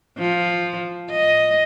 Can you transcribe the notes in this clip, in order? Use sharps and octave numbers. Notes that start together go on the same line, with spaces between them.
F3
D#5